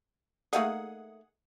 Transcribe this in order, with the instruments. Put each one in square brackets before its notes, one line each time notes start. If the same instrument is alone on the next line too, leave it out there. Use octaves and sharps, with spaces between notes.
[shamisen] A3 A#3 D#4 [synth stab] G#4 F#5 D#6